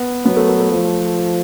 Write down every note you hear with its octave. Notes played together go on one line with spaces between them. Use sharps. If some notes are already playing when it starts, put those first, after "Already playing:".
Already playing: B3
F#3 B3
A3
A3
A3
F3